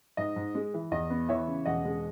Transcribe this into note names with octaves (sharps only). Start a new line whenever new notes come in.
G#2 D#5
G#2
G#3
E3
E2 D#5
B3
E3 C#5 E5
C#3
E1 D#5 F#5
G#3